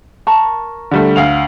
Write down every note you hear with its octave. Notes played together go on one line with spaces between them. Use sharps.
A#4 A5 C#6
D3 G3 A3
D2 F5 F7